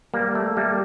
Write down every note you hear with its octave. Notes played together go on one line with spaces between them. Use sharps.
G3 A#3
A3
G3 A#3